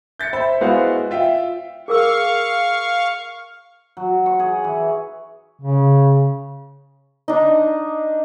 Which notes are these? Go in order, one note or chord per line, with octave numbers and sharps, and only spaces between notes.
G6 A6 B6 C#7
C5 E5 B5
G#3 B3 E4 F#4 C5 F5
F4 E5 G5
G#4 A#4 F5 C#6 E6
F#3
C#6
G#4
E3
C#3
D4 D#4